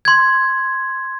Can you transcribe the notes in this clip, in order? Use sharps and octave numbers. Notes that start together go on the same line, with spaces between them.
C6 G#6